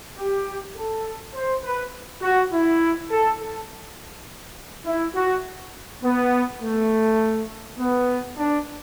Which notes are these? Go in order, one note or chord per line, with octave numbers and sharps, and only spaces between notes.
G4
A4
C5
B4
F#4
E4
A4
A4
E4
F#4
B3
A3
B3
D4